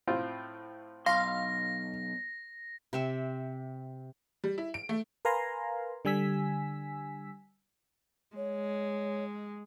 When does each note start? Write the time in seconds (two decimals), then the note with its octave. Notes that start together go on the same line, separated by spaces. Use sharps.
0.07 A2 C4 F4
1.06 B1 F5 C6 A#6
2.93 C3 C4 E5
4.44 G3
4.58 E4
4.74 D7
4.89 A3
5.25 A#4 B4 F5 G#5 A#5 C6
6.05 D3 G3 G#5 E6 B6
8.36 G#3 C#5